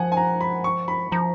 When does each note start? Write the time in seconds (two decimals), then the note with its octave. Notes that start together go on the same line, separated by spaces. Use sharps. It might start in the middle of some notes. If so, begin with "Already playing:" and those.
Already playing: F3 F#5 G#5
0.12 G#5
0.17 A#5
0.41 B5
0.64 C#6
0.88 B5
1.12 F3 A#5